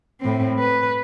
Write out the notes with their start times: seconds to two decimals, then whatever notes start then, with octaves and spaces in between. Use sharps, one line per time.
0.20 A2 C4
0.59 B4